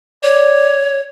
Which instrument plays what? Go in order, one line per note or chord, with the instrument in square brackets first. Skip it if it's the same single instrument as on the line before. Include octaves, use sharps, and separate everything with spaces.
[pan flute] C#5 [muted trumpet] D5